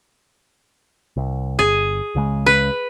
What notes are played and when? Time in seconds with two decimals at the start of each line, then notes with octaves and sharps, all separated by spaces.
1.16 C2
1.59 G1 G#4
2.15 C#2 C#3 G#3
2.46 B4